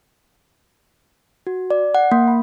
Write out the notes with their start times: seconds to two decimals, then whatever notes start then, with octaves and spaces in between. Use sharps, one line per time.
1.47 F#4
1.70 D5
1.95 F#5
2.12 A#3
2.28 B5